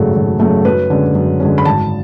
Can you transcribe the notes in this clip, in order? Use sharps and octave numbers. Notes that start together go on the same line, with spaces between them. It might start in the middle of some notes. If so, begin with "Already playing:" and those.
Already playing: G#1 F#2 C#3 F#3 A3 A4
G#1
F#2 C#3 F#3 A3
F#2 B4
D3 G#3 C#4
F#2
D3 G#3 C#4
B5
G#1 A5